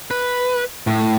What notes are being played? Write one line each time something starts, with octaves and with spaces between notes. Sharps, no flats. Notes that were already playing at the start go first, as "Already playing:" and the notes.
B4
A2